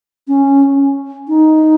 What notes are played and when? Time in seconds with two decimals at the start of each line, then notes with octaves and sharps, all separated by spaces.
0.28 C#4
1.28 D#4